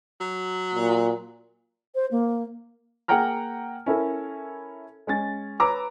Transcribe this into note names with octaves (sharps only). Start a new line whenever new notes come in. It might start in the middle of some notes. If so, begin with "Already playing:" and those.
F#3
A#2
C5
A#3
A#3 G#4 F#5 G5 A#5 F6
C#4 E4 A4 A#4
G#3 C#4 A6
B4 C#5 A#5 D6 E6